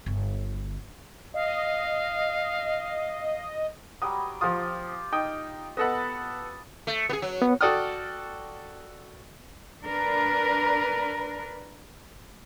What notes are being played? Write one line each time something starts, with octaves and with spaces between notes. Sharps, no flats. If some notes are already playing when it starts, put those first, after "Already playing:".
G1 D3
D#5 F5
F#3 G3 G5 D#6
F3 F4 G4 D#6
D#4 G5 D#6
B3 A4 D#5 F#5 A5 B5
A3
B3 G#4
F#3
B3
F#4 A4 D5 G5 D#6 F6
D4 A#4 B4